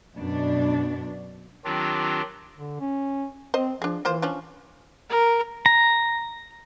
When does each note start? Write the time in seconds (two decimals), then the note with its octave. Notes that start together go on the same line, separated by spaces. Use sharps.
0.16 F#2 B2 D4
1.65 D#3 F#3 C4 D4 F4 G4
2.57 D3
2.80 C#4
3.54 C4 C5 D#5
3.82 F3 D4 G#4
4.05 E3 A#3 F4 C5
4.22 F3 C#4 D4
5.10 A#4
5.66 A#5